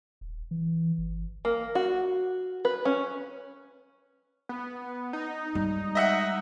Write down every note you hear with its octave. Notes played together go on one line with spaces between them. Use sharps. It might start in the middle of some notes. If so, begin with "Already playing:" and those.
D#1
E3
G1
A#3
F#4
B4
C#4
B3
D#4
G3 G#3
D#5 E5 F#5